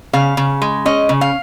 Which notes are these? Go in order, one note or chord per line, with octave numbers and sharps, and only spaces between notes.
C#3 F5
C#3
G#3
C#4 D#5
C#3
F5